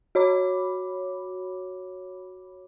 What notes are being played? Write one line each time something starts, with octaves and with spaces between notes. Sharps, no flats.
F#4 C#5 B5 D6